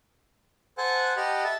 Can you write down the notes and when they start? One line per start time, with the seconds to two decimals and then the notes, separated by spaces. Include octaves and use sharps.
0.78 A4 C5 F#5 G#5 F#6
1.17 G4 D#5 F#5 A5 B5 F6
1.44 A4 E5 A5